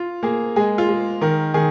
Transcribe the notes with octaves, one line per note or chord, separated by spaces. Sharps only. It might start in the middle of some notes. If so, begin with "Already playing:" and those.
Already playing: F4
A#3 G#4
G#3 G#4
F4
G#3
D#3 A#4
D#3 G#4